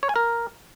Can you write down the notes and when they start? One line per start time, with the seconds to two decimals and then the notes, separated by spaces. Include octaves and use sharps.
0.03 C#5
0.09 G#5
0.16 A#4